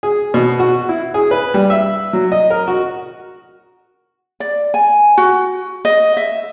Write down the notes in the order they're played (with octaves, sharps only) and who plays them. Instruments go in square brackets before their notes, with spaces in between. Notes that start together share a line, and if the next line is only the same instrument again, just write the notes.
[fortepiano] G#4
B2
F#4
E4
G#4
B4
G3
E5
F#3
D#5
A#4
F#4
[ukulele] D5
G#5
F#4
D#5
E5